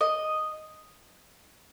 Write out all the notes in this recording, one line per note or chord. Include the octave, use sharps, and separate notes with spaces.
D#5